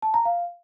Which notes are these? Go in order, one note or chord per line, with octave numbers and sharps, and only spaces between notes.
A5
A#5
F5